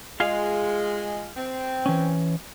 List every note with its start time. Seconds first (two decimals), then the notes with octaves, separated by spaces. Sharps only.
0.20 G#3 F4 G#4 F5
1.36 C4
1.86 E3 C#4